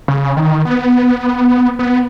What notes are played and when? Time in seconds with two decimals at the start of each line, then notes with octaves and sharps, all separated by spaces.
0.08 C#3
0.37 D#3
0.65 B3
1.79 B3